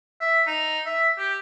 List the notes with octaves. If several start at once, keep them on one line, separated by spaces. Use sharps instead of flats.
E5
D#4
E5
G4